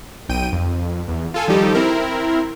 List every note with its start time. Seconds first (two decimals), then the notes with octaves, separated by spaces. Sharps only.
0.29 B1 G5 D#7
0.52 F2
1.08 E2
1.34 F4 A4 G#5
1.47 D#3 F3 G3 D#4 G4 A4
1.74 C4 E4 A#4